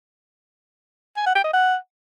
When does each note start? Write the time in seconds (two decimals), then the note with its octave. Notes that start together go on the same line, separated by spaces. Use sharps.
1.17 G#5
1.26 F#5
1.35 G5
1.44 D#5
1.53 F#5